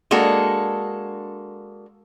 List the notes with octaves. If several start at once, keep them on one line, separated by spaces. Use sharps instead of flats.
G#3 A#3 D4 F#4 A4